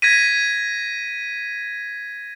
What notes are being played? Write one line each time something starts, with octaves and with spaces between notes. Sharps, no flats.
G#6 A#6 B6 D#7